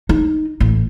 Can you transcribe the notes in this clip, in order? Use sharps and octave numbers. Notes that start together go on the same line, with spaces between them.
D#4
A1